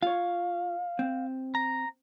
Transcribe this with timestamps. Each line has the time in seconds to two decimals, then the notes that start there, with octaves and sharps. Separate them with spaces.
0.03 F4 C#5 F5
0.99 C4
1.55 A#5